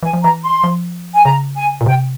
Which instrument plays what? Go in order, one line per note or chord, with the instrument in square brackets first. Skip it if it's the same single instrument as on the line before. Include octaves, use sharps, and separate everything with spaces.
[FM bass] E3 [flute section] G#5
[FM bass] F3
[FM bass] E3 [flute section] A#5
[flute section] C6
[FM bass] F3
[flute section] G#5
[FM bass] C#3 [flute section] A#5
[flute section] G#5
[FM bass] A#2
[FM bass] C3 [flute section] G5